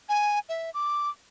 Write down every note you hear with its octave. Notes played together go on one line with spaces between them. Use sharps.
G#5
E5
D6